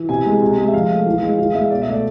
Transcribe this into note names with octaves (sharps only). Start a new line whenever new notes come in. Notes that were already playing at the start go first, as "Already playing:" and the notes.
Already playing: E3
C3 G#5
G#3
C3
G#3
E5
F3 F5
A3
E3
G#3
E3 F5
G#3 E5
B2 D5
E5
A3 D5